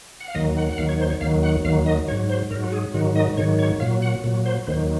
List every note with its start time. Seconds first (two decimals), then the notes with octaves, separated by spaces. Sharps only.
0.20 F#5
0.28 F5
0.35 D#2 D#3 F#3 D#5
0.57 F#5
0.69 F#5
0.78 D#2 D#3 F#3 F5
0.89 C#5
1.00 C5
1.10 C#5
1.21 D#2 D#3 F#3 F5
1.43 F#5
1.65 D#2 D#3 F#3 F5
1.86 D#5
2.08 F#3 C#5
2.12 G#2
2.29 C5
2.51 G#2 F#3 A#4
2.64 F#4
2.72 G#4
2.94 G#2 D#3 F#3 F#4
3.16 D#5
3.37 G#2 D#3 F#3 C#5
3.59 C#5
3.80 A#2 F#3 F5
4.02 F#5
4.24 A#2 F#3
4.46 C5
4.67 D#2 D#3 F#3 C5